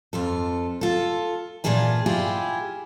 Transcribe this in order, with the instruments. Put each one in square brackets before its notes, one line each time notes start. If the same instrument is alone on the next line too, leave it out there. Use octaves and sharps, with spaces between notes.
[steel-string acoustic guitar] F2 F4 A4
F4 A4
A#2 C#3 E3 F4 G#4 A5
E4 F4 G4 G#4